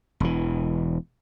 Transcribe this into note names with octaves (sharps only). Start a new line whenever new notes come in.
E1 E3